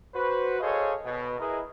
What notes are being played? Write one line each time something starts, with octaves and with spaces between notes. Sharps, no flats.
F#4 B4 C5
G#4 A4 C5 C#5 D#5 F5
B2
E4 G#4 A#4 B4 D#5